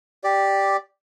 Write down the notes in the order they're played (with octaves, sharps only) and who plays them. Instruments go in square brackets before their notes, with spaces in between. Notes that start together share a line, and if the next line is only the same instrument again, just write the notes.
[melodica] G4 D5